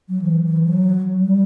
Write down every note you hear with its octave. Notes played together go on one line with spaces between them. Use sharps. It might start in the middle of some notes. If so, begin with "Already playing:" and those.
F#3
E3
E3
F#3
G3